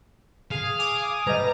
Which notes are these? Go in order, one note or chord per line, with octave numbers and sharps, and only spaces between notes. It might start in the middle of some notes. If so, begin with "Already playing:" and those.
G#4 F5
G#5 D6 D#6
G3 B4 D#5 A#5